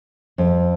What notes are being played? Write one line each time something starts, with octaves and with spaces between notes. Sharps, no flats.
F2